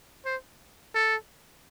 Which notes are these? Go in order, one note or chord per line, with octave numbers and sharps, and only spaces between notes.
C5
A4